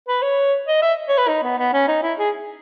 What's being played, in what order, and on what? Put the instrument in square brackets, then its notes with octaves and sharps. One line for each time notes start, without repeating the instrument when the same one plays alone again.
[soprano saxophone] B4
C#5
D#5
E5
C#5
B4
D#4
B3
B3
C#4
D#4
E4
G#4